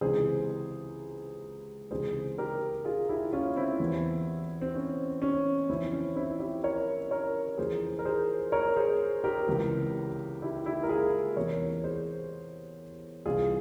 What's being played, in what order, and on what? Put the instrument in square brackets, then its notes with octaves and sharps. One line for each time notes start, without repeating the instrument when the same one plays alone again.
[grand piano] C#2 C3 E3 G#4 C5
C#2 C3 E3 G#4 C5
G4 A#4
F4 G#4
E4 G4
C#4 F4
C4 E4
E2 E3
C4
C#4
C#4
F2 E3 C4 E4
C#4
C4 E4
E4 G4
A#4 C#5
A#4 C#5
F2 E3 G#4 C5
A#4
G#4 C5
A#4 C#5
G#4 C5
G4 A#4
C#2 C3 E3
E4 G4
E4 G4
A#4
F4 G#4
E2 C3 E3 A#4 C#5
G#4 C5
C2 C3 E3 F4 G#4